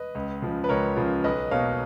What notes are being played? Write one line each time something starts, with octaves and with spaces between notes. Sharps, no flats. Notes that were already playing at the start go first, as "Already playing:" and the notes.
Already playing: B4 D#5
C#2
C#3 F3
B4
C#2 A#4 C#5
C#3 F3
B1 B4 D#5
B2 A#3 C#5 F5